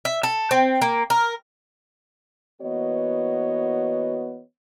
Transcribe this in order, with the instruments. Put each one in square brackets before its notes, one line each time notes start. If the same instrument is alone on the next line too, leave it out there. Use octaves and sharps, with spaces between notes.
[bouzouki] E5
A4
C4
A#3
A#4
[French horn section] E3 A#3 B3 F#4 C#5 D#5